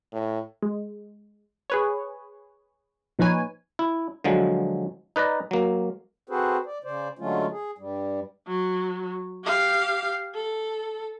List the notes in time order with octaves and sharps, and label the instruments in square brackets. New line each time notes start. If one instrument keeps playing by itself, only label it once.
[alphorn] A2
[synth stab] G#3
G#4 B4 C#5
A#2 F3 D#4 B4 C#5 G#5
[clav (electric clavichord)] E4
D3 F3 F#3 G#3
D#4 B4 D5 A#5
F#3 A#3
[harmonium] C4 F#4 G#4 A4 B4 C5
D5
C#3 C5 D5
D3 F#3 G#3 A3 C#4 F4
G#4
G2 G3
[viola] F#3
G4 F5
A4